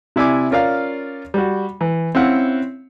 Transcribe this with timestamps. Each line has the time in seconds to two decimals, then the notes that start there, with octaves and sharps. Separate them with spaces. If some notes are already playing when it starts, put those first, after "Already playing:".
0.16 C3 E4 D5 G#5 D6
0.51 C#4 F4 A#4 D5 F5
1.34 G3 F#4
1.81 E3
2.15 C4 C#4 E4 F5 F#5